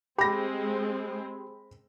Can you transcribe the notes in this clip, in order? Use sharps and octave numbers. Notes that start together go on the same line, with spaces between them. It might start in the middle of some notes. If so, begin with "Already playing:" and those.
G#3 C4 G4 B5 A#6